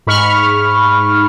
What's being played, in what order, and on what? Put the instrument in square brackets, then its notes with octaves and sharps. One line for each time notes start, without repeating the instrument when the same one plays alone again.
[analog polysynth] G#2 B5 C#6 F6